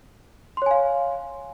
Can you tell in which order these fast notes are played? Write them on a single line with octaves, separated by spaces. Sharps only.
C6 C#5 G#5 F5